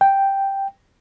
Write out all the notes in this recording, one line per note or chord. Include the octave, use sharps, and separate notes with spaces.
G5